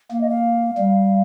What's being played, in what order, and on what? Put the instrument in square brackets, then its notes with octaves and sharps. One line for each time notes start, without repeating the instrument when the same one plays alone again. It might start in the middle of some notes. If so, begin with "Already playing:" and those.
[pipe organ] A#3 [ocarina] F5
[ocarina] D#5
F5
[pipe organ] G3